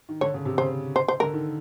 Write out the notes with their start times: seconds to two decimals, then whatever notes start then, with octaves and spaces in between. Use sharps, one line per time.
0.09 D#3
0.21 D3 C#5
0.34 C#3
0.45 C3
0.58 C#3 C5
0.96 C5
1.08 C5
1.20 D3 A#4
1.34 D#3